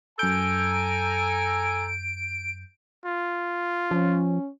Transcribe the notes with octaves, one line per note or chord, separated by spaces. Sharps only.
F#2 A4 G#5 A#5 G6 D7
F4
F3 C#4